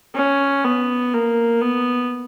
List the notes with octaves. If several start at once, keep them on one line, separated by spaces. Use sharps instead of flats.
C#4
B3
A#3
B3